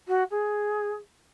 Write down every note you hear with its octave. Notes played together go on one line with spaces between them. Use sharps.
F#4
G#4